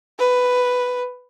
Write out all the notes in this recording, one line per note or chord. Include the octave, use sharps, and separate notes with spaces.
B4